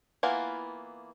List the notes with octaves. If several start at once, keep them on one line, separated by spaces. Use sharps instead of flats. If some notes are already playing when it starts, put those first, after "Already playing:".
E3 A#3 B3 E4 F4